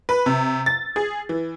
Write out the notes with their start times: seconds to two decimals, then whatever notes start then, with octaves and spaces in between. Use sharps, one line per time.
0.09 B4
0.26 C3
0.66 A6
0.96 G#4
1.29 E3